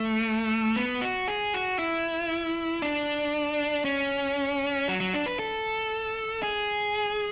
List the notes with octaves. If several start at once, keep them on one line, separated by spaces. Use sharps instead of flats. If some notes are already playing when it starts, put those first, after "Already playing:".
Already playing: A3
B3
F#4
G#4
F#4
E4
D4
C#4
F#3
F#3
D4
B4
A4
G#4